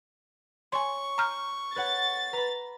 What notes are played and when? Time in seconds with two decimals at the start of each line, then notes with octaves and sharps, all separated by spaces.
0.72 C#5 G#5 C6 C#6
1.18 A#5 F6 G6
1.76 B4 C#5 F#5 A6
2.33 B4 A#5 B5